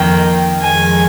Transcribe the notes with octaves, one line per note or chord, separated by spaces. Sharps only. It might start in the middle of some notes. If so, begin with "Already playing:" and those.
Already playing: F2 D#3 A#3 G5
F2 D#3 G#3 G#5